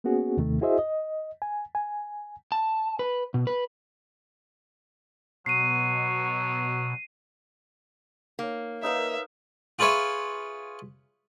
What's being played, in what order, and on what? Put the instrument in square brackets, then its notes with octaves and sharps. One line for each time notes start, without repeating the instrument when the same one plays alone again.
[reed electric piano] A#3 B3 C#4 F#4 G#4
D#2 C3 D#3 A3
E4 F#4 G#4 C5 D#5 E5
D#5
G#5
G#5
[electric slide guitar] A5
B4
B2
B4
[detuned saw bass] B2 [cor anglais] F#3 [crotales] C7 D#7
[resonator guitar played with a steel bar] A#3 [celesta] D#4 C#5
[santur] D#4 A#4 F5 [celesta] B4 C#5 [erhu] E5
[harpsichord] F4 G#4 B4 C#5 E5